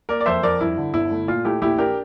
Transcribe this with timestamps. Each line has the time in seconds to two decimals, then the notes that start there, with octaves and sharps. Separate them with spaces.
0.09 A#3 A#4 D5
0.20 D5
0.26 F2 C5 E5
0.43 F2 A#4 D5
0.61 G2 E4
0.77 D3
0.94 G1 E4
1.11 A3
1.27 A#2 F4
1.45 A3 E4 G4
1.61 A#1 E4 G4
1.78 D4 G4 A#4